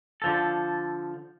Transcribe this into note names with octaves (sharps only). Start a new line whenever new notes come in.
D3 F3 A4